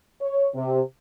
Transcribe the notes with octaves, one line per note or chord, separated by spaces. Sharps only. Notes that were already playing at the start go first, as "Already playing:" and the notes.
C#5
C3